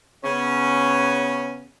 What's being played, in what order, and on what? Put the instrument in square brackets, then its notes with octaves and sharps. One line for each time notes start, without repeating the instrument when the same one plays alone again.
[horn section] C#3 B3 C#4